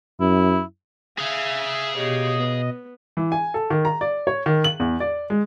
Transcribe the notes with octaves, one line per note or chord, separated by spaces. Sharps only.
F#2 E4
G#4 E5 F5 G#5
B2 G4 C#5 D#5
B3
E3
G#5
A4
D#3
A#5
D5
C#5
D#3
F#7
E2
D5
G#3